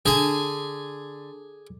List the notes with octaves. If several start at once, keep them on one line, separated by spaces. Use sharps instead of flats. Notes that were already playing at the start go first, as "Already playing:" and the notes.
D3 G#4 G#5